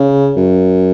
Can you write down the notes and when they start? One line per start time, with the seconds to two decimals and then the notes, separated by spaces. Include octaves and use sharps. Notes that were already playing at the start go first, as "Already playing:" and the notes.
Already playing: C#3
0.37 F#2